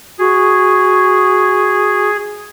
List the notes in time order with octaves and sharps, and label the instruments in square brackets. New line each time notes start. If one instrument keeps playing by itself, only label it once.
[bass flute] F#4 [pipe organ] G#4